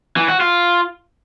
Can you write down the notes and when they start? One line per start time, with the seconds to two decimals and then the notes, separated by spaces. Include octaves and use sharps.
0.16 E3
0.28 F#4
0.40 F4